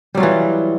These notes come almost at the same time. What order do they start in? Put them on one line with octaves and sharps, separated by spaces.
G3 F#3 F4 E3